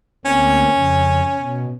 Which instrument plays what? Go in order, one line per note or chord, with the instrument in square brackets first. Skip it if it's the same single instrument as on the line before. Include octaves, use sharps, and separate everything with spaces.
[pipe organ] D2 A#3 C4 [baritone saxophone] C#4
[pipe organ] F2 C#3
B2